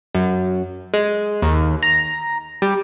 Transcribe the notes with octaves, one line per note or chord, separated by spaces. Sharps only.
F#2
G#3
D#2
A#5
G3